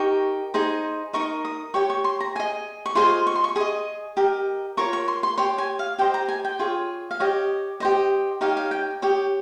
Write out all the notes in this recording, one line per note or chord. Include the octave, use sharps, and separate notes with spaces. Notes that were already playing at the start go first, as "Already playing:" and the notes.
Already playing: D#4 G4 A#4 C#6
D#4 G#4 C5 D#5
D#4 A#4 D#5 C#6
D#6
G4 C#5 C#6
C#6
C6
A#5
G#4 D#5 G#5
C#6
F4 G#4 C5 D#5 C6
C#6
C6
C#6
G#4 D#5 D#6
G4 A#4 D#5
F4 A#4 C#5 C#6
C#6
C6
C6
G4 C#5 C6
G#5
F5
G4 C5 D#5 G5
A#5
G#5
G5
F4 G#4 C#5
F5
G4 C#5 D#5
G4 C5 D#5
D#4 G4 C#5 F5
F5
G5
G4 C#5 D#6